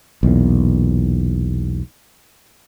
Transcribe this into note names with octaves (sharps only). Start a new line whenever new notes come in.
B1 E2 A#2